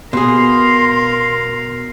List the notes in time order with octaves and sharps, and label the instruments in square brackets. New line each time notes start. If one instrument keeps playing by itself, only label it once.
[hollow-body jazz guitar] B2 G#4 [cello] A#4 F5 [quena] C6